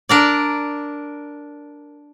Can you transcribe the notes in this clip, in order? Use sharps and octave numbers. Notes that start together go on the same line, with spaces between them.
D4 A#4 D5